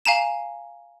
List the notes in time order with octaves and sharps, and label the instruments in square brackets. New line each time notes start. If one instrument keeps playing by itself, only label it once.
[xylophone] F5 G#5 A#5 E7